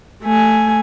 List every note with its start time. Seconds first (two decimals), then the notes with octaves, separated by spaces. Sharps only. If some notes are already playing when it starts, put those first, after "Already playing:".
0.23 A3 G#5